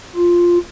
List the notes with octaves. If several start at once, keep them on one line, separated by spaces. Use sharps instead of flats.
F4